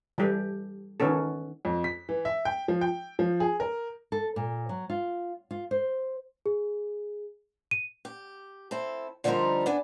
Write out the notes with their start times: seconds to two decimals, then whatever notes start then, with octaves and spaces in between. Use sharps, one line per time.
0.18 E3 G3 G4 A4
1.00 D#3 E3 B3 C#4 A4
1.65 F2
1.84 B6
2.09 E3
2.25 E5
2.45 G5
2.68 F3
2.81 G5
3.19 F3
3.40 G#4
3.60 A#4
4.12 A4
4.36 A#2
4.69 F#3
4.90 F4
5.51 F4
5.71 C5
6.46 G#4
7.71 D#7
8.05 G4
8.71 C4 E4 A4
9.24 D3 F3 G3 C4 D#4 A#4
9.66 B3 D4 G#5